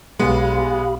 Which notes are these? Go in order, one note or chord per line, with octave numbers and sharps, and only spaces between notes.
B1 G#3 B3 G4 F5 B5